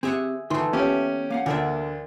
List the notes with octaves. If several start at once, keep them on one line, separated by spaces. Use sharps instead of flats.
C4 G4 G#4 E5 F#5
D2 D#3 E3 A3 C6
A#3 B3 C#4 G4
A#3 F5 F#5
D2 D3 A#4 D5 E5